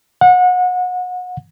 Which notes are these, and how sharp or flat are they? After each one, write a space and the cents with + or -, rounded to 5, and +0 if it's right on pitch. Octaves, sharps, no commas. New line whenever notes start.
F#5 -30